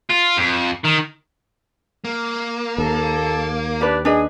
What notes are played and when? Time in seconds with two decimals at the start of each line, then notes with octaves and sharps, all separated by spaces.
0.10 F4
0.37 F2
0.85 D#3
2.04 A#3
2.78 D#2 A4
3.81 D4 G4 B4
4.05 D4 G#4 B4 D#5